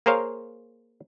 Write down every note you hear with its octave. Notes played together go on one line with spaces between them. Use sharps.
A#3 G#4 A#4 C5 C#5 F5